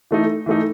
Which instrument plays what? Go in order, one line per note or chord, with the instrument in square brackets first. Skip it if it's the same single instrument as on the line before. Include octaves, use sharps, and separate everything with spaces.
[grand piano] E3 A3 D#4
E3 A3 D#4